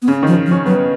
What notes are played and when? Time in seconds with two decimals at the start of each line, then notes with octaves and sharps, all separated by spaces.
0.02 B3
0.08 C#3 C#4
0.23 D#3 F3
0.46 F3
0.51 C#4
0.66 F#3 B3